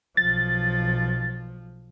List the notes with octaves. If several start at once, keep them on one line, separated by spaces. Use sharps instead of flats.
B1 F3 A6